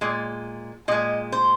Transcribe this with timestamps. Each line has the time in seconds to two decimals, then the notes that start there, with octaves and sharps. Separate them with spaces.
0.01 A#2 G#3
0.88 A#2 G#3 D#5
1.32 C5